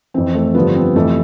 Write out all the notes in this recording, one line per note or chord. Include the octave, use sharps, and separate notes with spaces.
F2 E3 C4
A3
G2 D3 F3 B3
C4
F2 C3 E3 A3